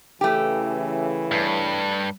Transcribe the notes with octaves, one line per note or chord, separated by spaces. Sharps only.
C#3 E3 A3 G4
G2